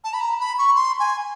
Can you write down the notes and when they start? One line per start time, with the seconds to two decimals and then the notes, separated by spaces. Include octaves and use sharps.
0.04 A5
0.13 B5
0.21 A#5
0.40 B5
0.58 C#6
0.75 C6
1.00 G#5